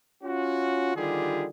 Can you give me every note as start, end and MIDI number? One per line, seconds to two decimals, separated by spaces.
0.23 0.93 61
0.23 0.93 65
0.23 0.93 66
0.95 1.47 50
0.95 1.47 51
0.95 1.47 55
0.95 1.47 65
0.95 1.47 67
0.95 1.47 68